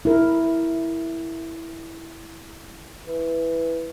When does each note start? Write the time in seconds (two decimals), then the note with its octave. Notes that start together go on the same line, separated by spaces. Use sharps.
0.05 E4 A#4
3.08 E3